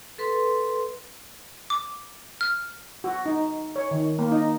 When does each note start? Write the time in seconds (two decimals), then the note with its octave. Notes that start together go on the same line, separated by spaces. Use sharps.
0.18 A4 B4 C6
1.70 D6
2.41 F6
3.04 F#4
3.26 D#4
3.76 C#5
3.91 D#3
4.19 A#3
4.32 D#4